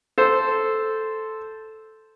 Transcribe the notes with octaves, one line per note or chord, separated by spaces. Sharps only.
A4 C5